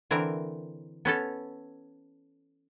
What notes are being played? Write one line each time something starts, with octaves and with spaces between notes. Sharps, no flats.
D3 E3 C4 A#4
B3 C#4 A4